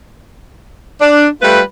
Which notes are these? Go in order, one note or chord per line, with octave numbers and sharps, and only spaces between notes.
D4
G3 A3 F4 B4